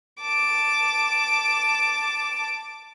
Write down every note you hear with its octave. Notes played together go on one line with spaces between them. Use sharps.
A5 D6